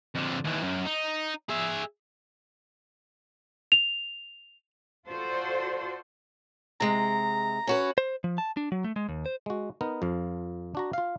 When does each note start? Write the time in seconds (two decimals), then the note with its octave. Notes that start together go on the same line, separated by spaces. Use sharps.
0.15 F2 D3
0.44 D#2 E3
0.63 F#2
0.85 D#4
1.49 G#4 E5
3.72 F7
5.08 F4 F#4 A4 C5 D5
6.80 C3 G#3 A#5
7.67 C#4 F#4 B4
7.98 C5
8.24 F3
8.38 A5
8.57 D4
8.72 F#3
8.84 A3
8.96 G#3
9.09 D#2
9.26 C5
9.46 G#3 F#4
9.81 B3 D#4 A#4
10.02 F2 F3 F5
10.75 D4 F#4 A#5
10.93 F4 F5